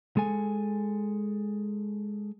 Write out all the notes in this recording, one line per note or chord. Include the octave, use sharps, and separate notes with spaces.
G#3 A4 G#5